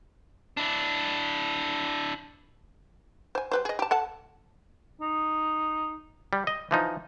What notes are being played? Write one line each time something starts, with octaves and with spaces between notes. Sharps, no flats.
D4 E4
C5 G#5
G3 B4 C5
G#4 D#5
G4 A5
A4 F#5 A5
D#4
G3
D#5
E3 F3 D#4